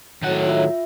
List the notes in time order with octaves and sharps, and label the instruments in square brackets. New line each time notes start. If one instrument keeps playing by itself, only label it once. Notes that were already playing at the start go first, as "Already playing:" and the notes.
[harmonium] A2 F#3 [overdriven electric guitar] D#3 F#5
[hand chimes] F4 E5